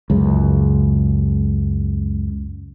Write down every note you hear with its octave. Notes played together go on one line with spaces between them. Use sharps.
C#2 F#2 C#3